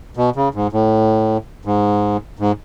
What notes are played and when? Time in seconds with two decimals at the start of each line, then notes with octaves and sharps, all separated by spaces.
0.17 B2
0.36 C#3
0.54 G#2
0.73 A2
1.65 G#2
2.39 G#2